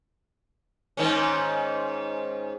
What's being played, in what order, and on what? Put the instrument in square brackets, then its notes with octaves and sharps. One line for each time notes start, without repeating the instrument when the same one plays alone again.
[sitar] G#2 D#3 C#4